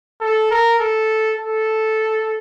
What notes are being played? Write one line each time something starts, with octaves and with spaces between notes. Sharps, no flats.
A4
A#4
A4
A4